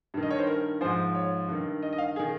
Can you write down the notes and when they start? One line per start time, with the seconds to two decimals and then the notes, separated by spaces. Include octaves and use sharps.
0.14 G2 D#3
0.23 D#5
0.31 C#5
0.39 C5
0.47 A#4
0.81 G#2 F3 C5
1.15 C#5
1.48 G2 D#3
1.83 D#5
1.93 D#5
1.98 F5
2.16 G#4
2.20 D#3